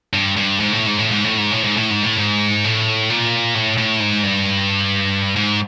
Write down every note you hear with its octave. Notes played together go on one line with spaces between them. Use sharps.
G2
G2
G#2
A2
G#2
A2
G#2
A2
G#2
A2
G#2
A2
G#2
A2
G#2
A2
A#2
A2
A2
G#2
G2
G#2